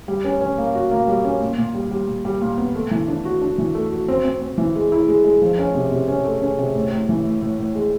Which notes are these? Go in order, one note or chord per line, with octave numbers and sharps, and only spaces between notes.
G3
C#4
C#4
A#3
F#4
A#3
G3
C#4
A#2
A#2
G3
G3
A#2
G3
A#2
B3
A3
E3
D4
F#4
D4
E3
A3
F#4
C4
C4
C4
E3
G#3
E4
G#3
G#3
F3
C#4
C3
C3
C#4
A3
C#4
C3
A2
A2
E3
A2
A2
A2
G#3